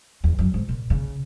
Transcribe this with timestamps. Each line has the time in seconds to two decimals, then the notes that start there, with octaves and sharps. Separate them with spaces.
0.24 E2
0.39 F#2
0.54 G#2
0.69 A#2
0.90 C#3